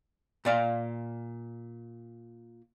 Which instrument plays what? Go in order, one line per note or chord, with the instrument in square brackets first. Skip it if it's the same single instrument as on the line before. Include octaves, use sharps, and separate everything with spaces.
[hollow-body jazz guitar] A#2 D5 F5